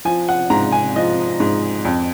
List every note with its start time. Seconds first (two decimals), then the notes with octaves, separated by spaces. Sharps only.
0.05 F3 G#5
0.29 F#5
0.50 G#2 A#5
0.72 G#5
0.96 F3 D#5
1.40 G#2
1.85 F2